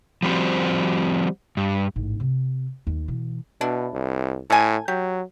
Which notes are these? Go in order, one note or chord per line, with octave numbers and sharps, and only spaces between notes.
F3 G3 C4 F#4 C5
G2
A1 G#2
C3 C4
D#2
B2 E3
B2 D4 E4
C2
A2 A4 G#5
F#3 G4